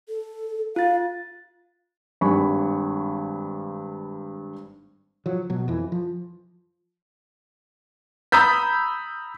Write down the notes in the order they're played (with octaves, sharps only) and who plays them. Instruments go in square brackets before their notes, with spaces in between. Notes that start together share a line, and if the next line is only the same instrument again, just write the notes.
[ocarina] A4
[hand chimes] F4 A6 [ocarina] F5
[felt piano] G#1 G2 G#5 B5 C#6
[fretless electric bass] F3 F#3
B2 F#3
F2 E3
F3
[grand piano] A#5 B5 D#6 E6 G6 B6